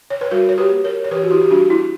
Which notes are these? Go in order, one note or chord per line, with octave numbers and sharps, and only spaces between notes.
C#5
B4
G3 F#4 A#4
C#5
G4 B4
A#3
A#4 C#5
C#5
E3 G4 B4
F#4
E4 G4
G4
G3 D4 F#4
E4